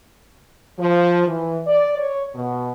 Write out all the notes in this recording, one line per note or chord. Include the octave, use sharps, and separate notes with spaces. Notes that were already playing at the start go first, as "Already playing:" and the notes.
F3
E3
D5
C#5
B2